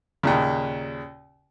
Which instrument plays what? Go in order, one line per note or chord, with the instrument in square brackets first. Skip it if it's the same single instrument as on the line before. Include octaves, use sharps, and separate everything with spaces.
[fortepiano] D#2 A#2 C#3